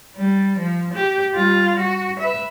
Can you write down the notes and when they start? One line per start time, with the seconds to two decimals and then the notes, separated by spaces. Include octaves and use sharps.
0.16 G3
0.58 F3
0.93 G4
1.34 G3 F4
1.79 F#4
2.19 B4 E5